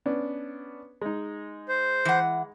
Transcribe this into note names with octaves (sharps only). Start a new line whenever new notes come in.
B3 C#4 D4
G#3 D#4
C5
E3 F#5